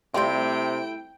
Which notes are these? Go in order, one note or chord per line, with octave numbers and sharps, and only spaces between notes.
C3 G3 A3 C4 E4 F4 G5 D7